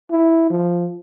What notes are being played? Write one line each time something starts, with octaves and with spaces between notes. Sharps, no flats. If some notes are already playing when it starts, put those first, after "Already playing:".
E4
F3